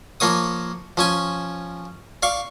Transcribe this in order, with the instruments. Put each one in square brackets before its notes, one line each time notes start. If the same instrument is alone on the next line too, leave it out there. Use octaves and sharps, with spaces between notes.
[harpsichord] F3 A#3 C#5 D#6
F3 C#4 G#5
D5 F5 C#6